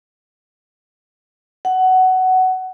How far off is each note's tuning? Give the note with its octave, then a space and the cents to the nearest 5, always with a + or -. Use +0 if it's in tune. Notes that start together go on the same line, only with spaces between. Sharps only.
F#5 +15